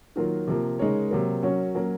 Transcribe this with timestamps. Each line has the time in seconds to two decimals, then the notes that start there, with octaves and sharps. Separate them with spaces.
0.16 D#3 F#3 A#3 F4 A#4
0.47 C3 F3 A#3
0.79 C#3 G#3 D#4 A#4 C#5
1.11 C3 F#3 A#3
1.43 F#3 C#4 F#4 A#4 C#5
1.75 F#3 A#3 C#4